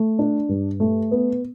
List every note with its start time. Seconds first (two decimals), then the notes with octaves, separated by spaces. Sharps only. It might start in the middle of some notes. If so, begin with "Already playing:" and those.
Already playing: A3
0.19 D4
0.49 G2
0.80 A3
1.11 B3